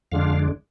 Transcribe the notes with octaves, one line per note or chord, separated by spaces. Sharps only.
F2 D3 G#3 D4 F5